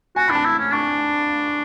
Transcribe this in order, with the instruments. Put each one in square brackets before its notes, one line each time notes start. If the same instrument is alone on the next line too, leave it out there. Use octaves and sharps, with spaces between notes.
[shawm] F#4 [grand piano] G#5
[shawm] D4 [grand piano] B5
[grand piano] A5
[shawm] E4
C#4
[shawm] D4 [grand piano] C#6